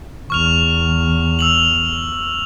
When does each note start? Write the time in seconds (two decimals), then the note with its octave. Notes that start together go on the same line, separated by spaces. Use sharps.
0.30 E2 C#6 F6 F7
1.39 E6 F7 F#7